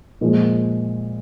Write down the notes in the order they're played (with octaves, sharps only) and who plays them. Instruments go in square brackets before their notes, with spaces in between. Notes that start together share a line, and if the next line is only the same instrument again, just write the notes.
[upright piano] A#2 F3 G#3